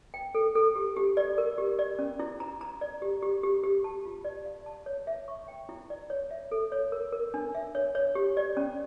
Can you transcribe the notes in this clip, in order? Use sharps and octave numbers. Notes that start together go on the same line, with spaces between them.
G5
A4
A4
G4
G4
D5
A#4
G4
D5
C#4
E4
A#5
A#5
D5
G4
G4
G4
G4
A5
F4
D5
F5
A5
C#5
E5
C#6
G5
E4
D5
C#5
E5
A4
C#5
A#4
A#4
D4
E5
C#5
C#5
G4
D5
C#4